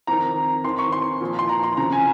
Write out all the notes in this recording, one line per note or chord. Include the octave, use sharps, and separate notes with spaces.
F2 D#3 A#5
F2 D#3 C6
C#6
C6
A#2 F3
C6
A#5
C6
F2 C#3 F3 A#5
G#5